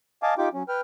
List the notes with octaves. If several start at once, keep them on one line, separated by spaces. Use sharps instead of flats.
D#5 F5 G#5 A5 D6
D#4 F4 G4 G5 D6
F#3 C#4
B4 G5 F6